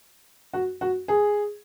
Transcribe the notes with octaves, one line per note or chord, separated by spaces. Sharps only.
F#4
F#4
G#4